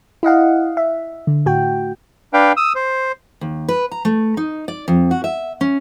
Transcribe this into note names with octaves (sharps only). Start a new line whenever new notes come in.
E4 D#5 F5 F#5
E5
D3
A2 F#4 G5
D4 B4 F5 G5
D#6 E6
C5
D#2
B4
A#5
A3
D#4
D5
F2
F#4
E5
C#4